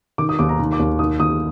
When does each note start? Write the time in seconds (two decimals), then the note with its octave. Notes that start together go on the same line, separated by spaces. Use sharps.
0.18 D#3 D6
0.29 D#6
0.39 D#2 D6
0.49 A#5
0.59 D#3
0.73 D6
0.79 D#2
0.99 D#3 D#6
1.20 D#2 D#6